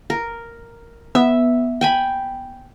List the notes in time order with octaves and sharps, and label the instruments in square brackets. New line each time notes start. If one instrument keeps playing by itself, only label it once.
[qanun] A#4
[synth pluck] B3 [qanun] E5
[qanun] G5 G#5 B5